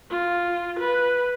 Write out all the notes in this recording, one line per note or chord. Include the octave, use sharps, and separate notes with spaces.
F4
B4